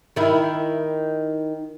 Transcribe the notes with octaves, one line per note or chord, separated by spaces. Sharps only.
D#3 E4